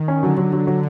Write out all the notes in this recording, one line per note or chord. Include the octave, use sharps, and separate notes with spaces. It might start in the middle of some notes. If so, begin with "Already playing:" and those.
Already playing: D#3
C#4
D3 F#3
F#3
F#3
F#3